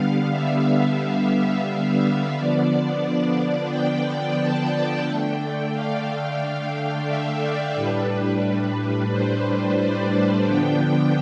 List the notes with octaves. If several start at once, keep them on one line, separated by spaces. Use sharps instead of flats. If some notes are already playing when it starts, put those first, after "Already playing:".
Already playing: D3 G3 B3 F5
E5
E5
D3 F3 B3 D4 D5
G5
A5
D3 A3 D4 G5
F5
E5
D5
A2 G3 D4 B4
C5
D5
D3 F3 B3 D4 G5